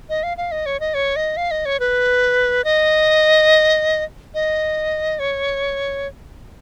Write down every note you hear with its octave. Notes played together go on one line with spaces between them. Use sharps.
D#5
F5
F5
D#5
C#5
D#5
C#5
D#5
F5
D#5
C#5
B4
D#5
D#5
C#5